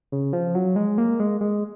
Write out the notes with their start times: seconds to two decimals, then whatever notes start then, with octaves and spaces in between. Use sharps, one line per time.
0.12 C#3
0.33 F3
0.55 F#3
0.76 G#3
0.98 A#3
1.20 G#3
1.41 G#3